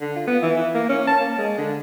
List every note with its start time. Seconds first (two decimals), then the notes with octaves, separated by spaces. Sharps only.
0.01 D3
0.16 F4
0.27 B3
0.42 E3
0.57 E4
0.74 A#3
0.89 C#4
1.07 A5
1.20 A#3
1.38 G#3
1.58 D3